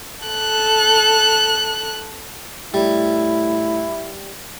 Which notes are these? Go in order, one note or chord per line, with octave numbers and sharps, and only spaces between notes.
A4 F#6
A2 G3 E4